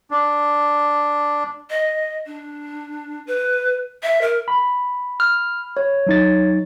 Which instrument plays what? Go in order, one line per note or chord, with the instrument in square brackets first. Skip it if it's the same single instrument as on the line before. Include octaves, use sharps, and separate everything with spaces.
[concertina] D4
[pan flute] D#5
D4
B4
E5
A#4
[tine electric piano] B5
[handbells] F6
C#5
[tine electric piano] F#3 D#4 A6